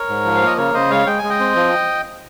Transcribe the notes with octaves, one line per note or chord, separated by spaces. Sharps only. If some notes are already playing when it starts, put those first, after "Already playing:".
Already playing: A#4 C#5
G#2
F3
F5
A#3 D#5
C#3 A#4 C#5
C#3 C5 D#5
G#3 C#5 F5
G#3 G5
G#3 G#5
D#5 G5
C4
F3